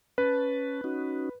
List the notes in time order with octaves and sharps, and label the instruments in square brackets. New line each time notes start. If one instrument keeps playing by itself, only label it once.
[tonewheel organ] C#4 A5 [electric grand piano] B4
[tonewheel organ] C#4 D#4 F#4